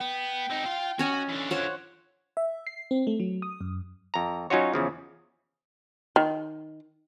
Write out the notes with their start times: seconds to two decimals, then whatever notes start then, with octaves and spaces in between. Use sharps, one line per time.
0.01 B3 G5
0.50 C4 D#4
0.66 F4 F5
0.99 C#4 F#4 C#5 D#5
1.29 D3 E3
1.51 F4 C5 C#5 F#5
2.37 E5
2.67 C7
2.91 C4
3.07 A3
3.20 F#3
3.42 D#6
3.61 F#2
4.14 F2 A#5
4.50 F#3 C#4 D#4 F4 F#4 C#5
4.74 E2 C#3 F3
6.16 D#3